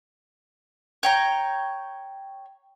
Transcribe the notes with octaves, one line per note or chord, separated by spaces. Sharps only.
C#5 G5 A#5